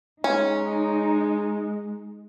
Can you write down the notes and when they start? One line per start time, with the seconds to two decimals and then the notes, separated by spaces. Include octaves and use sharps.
0.24 G#3 C#4 D#4